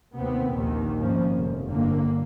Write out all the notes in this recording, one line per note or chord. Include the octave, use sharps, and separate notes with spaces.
D#2 C3 B3 C4
A#1 D#2 A#2 D#3
G#1 G#2 F3 A#3 C#4
F1
G1 C2 A2 D3 A#3